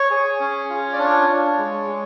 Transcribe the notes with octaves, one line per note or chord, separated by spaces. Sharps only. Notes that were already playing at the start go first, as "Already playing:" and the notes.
Already playing: C#5
G#4
C#4
F4
D5
D4 C#5
D4
G#3
G#3